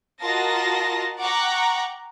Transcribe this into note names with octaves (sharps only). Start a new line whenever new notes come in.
F4 F#4 A#4 D#5 A5 A#6
F#5 G5 A#5 C#6 D6 F#6